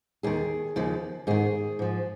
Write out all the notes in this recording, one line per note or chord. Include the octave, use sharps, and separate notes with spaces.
D#2 D#3 G#4
D#2 C#3 F3
G#2 D#3 G#4
G#2 F3